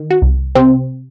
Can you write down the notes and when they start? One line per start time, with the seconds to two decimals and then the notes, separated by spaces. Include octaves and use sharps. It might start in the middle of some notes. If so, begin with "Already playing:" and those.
Already playing: D#3
0.11 F#4
0.22 C2
0.55 C3 C4